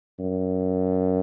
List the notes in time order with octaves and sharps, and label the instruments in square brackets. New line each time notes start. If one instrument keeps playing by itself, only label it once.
[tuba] F#2